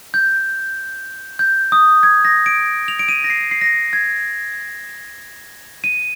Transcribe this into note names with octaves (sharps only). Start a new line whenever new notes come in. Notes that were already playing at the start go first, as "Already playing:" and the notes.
G6
G6
D#6
G#6
A#6
D7
F7
D7
D#7
A#6
C7
C7
A#6
G#6
D#7